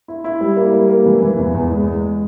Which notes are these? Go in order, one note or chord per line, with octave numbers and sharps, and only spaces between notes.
E4
E4
G3
A#3
G3
A#3
E3
E3
E2
E2
G#3
G#3